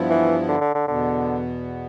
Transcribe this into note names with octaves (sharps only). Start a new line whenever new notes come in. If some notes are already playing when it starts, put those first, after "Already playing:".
Already playing: G2 F3 B3 E4
E3
D3
D3
D3
E2 B2 D3 B3